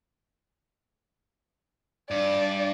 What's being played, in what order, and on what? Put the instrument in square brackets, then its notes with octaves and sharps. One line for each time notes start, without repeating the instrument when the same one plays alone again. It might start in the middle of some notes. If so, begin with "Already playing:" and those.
[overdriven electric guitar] G2 [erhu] D5